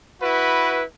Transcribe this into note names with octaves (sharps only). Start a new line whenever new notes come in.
E4 F#4 B4